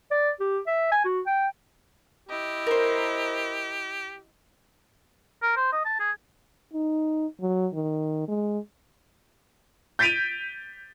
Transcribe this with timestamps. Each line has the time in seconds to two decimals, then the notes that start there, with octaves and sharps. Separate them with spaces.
0.11 D5
0.40 G4
0.67 E5
0.91 G#5
1.04 F#4
1.26 G5
2.29 E4 G4 D#5
2.67 A#4 C5
5.42 A#4
5.56 C5
5.72 D#5
5.85 A5
5.99 G#4
6.73 D#4
7.41 F#3
7.74 D#3
8.28 G#3
9.99 G6 A6 B6 D7 D#7 F7